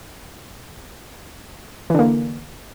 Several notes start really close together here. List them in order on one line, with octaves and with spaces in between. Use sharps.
E3 D3 A#3